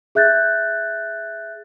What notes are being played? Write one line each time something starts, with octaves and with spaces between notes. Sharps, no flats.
G#4 E5 F#6 G6 A6